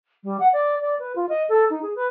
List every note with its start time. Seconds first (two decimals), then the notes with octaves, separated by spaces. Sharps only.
0.23 G3
0.39 F#5
0.52 D5
0.80 D5
0.99 B4
1.15 F4
1.29 D#5
1.49 A4
1.70 D#4
1.82 G#4
1.95 B4